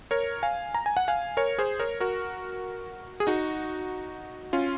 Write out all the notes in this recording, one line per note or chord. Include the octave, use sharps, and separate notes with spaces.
A#4 C#5
F5 G#5
A#5
G#5
F#5
F5 G#5
A#4 C#5
G#4 C5
A#4 C#5
F#4 A#4
G#4
D#4 F#4
C#4 F4